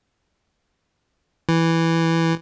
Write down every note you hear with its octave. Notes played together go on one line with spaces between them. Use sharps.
E3